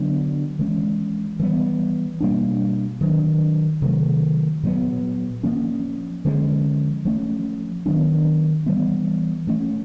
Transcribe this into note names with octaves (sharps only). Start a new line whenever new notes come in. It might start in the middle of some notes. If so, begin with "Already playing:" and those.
Already playing: D3 F#3 B3 D4
E3 G#3 C#4
E3 G3 B3
B2 G3 A#3 D4
D#3 F#3 A#3 D4
C3 D#3 F#3 A3
A#2 F#3 B3
F3 A#3 C#4
D3 F3 G#3 C#4
F3 A3 C#4
D#3 F#3 B3 D4
E3 G3 B3
F3 A3 C#4